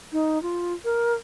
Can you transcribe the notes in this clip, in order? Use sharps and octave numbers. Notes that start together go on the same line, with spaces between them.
D#4
F4
A#4